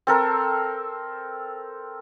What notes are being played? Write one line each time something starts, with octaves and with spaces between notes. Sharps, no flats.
C4 A4 A#4